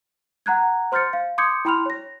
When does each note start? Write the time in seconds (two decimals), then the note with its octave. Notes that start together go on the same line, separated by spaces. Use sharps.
0.46 F#5 A#5 F#6 G#6
0.92 C5 C6 F6 G6 A6 C#7
1.13 F5
1.38 C6 D6 D#6 G6 G#6 C#7
1.65 E4 G5 B5 C6 F6 F7
1.86 C#5 A#6